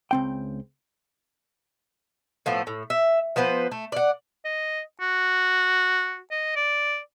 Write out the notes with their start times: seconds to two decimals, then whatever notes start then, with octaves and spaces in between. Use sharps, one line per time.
0.11 C#2 C4 G5
2.46 A2 F3 A3 B3
2.67 A2
2.90 E5
3.36 F3 B3 B4 C5
3.71 A3
3.92 D5 F#5
4.45 D#5
5.01 F#4
6.31 D#5
6.56 D5